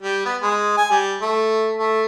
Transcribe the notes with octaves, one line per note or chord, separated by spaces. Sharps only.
G3
B3
G#3
G#5
G3
A3
A3